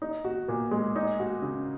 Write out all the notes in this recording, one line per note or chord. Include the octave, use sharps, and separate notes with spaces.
D#4
F#4
A#2
G#3
D#4
F#4
C#3